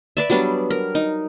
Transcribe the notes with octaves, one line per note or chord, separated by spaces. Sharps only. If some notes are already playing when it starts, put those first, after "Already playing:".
B4 D5 E5
F#3 G3 B3 D4
A#4
D#4